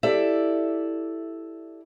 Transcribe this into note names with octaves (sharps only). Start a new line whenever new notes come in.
E4 G4 A4 D5 E5